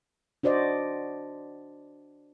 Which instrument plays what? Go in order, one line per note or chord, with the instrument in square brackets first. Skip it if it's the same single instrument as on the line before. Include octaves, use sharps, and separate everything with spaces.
[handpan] D4 F#4 C5 D5 D#5